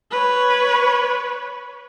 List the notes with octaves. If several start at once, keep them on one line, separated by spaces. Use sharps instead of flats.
B4 C#5